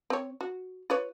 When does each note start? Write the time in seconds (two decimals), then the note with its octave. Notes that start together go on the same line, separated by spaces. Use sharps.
0.10 C4 C#5
0.41 F#4
0.90 F4 B4 C#5